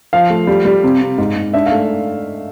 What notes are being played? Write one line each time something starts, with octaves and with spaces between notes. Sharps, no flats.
F3 F5
A3
G3
G3
C3
C3
G#2
G#2
D4 E5
F5
A3